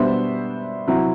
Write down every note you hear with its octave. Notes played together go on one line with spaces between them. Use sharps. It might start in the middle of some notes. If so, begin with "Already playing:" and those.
Already playing: B2 G3 B3 D4 C5 E5
C3 F#3 C4 E4